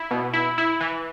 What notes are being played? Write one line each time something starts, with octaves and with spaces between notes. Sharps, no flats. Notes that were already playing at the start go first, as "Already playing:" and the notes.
Already playing: E4
B2
E4
E4
E3